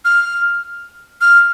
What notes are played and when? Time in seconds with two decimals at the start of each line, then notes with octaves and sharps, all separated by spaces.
0.05 F6
1.21 F6